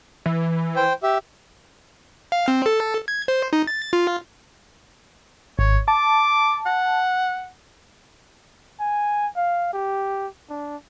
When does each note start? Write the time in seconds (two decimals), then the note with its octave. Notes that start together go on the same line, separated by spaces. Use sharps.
0.26 E3
0.76 C5 G5
1.03 G4 E5
2.32 F5
2.48 C4
2.66 A4
3.08 G#6
3.28 C5
3.53 D#4
3.67 A6
3.93 F4
5.59 G#1 C#5
5.88 A5 D6
6.66 F#5
8.80 G#5
9.36 F5
9.73 G4
10.50 D4